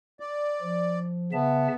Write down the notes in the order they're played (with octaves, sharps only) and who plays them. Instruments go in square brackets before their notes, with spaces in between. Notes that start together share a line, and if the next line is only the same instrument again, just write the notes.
[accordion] D5
[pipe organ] F3
[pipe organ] C#3 E5 A5 [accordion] B3